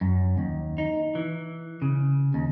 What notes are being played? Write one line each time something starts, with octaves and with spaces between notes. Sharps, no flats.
F#2
D#2
D#4
E3
C#3
D#2